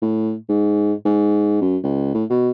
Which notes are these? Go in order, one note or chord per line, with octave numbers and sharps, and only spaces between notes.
A2
G#2
G#2
F#2
C#2
A2
B2